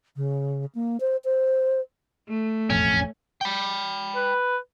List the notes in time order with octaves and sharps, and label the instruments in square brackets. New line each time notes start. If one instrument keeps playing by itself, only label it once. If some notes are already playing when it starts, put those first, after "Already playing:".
[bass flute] C#3
A#3
C5
C5
[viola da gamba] A3
[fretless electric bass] E1 A1 F2 [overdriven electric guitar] C#4
[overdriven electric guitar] G5 B5
[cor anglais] B4